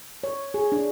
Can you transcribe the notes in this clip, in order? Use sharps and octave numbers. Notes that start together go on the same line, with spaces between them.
C#5
G#4
D4